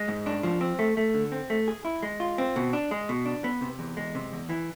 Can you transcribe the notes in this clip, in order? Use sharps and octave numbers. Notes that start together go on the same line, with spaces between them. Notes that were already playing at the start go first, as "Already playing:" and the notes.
Already playing: G#3
G#2
D4
F3
C4
A3
A3
D3
C4
A3
G#4
E4
G#3
F4
C4
B2
D4
G#3
B2
D4
B3
C3
E2
G#3
C3
E2
E3